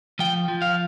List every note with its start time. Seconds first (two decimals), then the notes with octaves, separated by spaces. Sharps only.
0.19 F3 G5
0.48 F3
0.62 F5